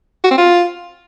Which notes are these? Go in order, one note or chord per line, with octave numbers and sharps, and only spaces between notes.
F#4
C4
F4